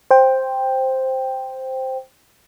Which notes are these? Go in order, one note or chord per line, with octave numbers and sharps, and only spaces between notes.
C5 G5